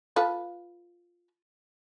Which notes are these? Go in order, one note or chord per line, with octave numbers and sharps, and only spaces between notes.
F4 A4 B4